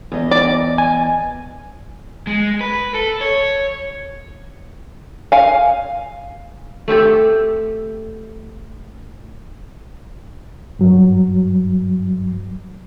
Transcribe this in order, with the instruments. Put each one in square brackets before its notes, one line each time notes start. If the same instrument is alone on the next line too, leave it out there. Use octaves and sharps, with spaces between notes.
[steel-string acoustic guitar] E2 D#5
[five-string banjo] D5
[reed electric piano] G#5
[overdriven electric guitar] G#3
B4
A4
C#5
[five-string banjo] F5 G#5
[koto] A3 C4 G4 A4
[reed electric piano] G2 F#3